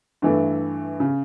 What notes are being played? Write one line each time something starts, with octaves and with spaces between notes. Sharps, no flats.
G2 E3 A3
C#3